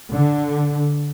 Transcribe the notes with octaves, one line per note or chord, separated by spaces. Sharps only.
D3